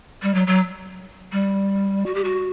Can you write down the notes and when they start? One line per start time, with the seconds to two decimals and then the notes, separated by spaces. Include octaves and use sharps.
0.22 G3
0.34 F#3
0.47 F#3
1.32 G3
2.06 F#4
2.14 G4
2.24 F#4